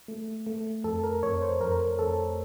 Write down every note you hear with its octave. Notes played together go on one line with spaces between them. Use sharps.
A3
A3
F2 A4
A#4
F2 C#5
C5
F2 A#4
F2 A4